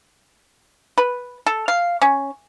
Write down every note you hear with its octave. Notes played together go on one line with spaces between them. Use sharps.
B4
A4
F5
C#4